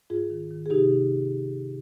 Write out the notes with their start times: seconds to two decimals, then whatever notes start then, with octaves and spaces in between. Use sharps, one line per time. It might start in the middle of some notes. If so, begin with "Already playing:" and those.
0.10 G#2 F4 G#4
0.30 D#3
0.51 D#3
0.66 G#4
0.70 C3 D#4 G4